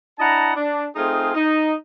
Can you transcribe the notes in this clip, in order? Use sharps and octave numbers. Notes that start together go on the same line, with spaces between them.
D4 E4 D#5 F#5 A5 A#5
D4
A3 C4 D#4 F4 G#4
D#4